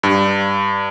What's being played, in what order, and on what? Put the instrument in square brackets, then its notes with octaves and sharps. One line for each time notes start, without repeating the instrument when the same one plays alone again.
[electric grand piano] G2